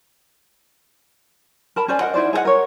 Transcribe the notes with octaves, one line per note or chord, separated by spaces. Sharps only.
A#4 A5 B5
C#4 C5 D5 G#5
A#4 C5 D#5 F#5
D#4 E4 C5 D5
G#4 A4 D#5 F#5
A#4 C#5